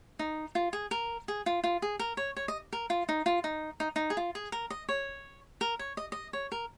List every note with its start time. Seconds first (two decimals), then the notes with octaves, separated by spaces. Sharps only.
0.19 D#4
0.55 F4
0.73 G#4
0.91 A#4
1.28 G#4
1.46 F4
1.64 F4
1.82 G#4
1.99 A#4
2.17 C#5
2.37 C#5
2.48 D#5
2.73 A#4
2.90 F4
3.09 D#4
3.26 F4
3.44 D#4
3.80 D#4
3.96 D#4
4.10 G#4
4.17 F4
4.35 G#4
4.52 A#4
4.70 D#5
4.89 C#5
5.61 A#4
5.79 C#5
5.97 D#5
6.12 D#5
6.33 C#5
6.52 A#4